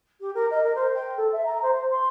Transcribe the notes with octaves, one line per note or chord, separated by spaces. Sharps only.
G4
A#4
D#5
A#4
C5
G5
A4
E5
A#5
C5
C5
C6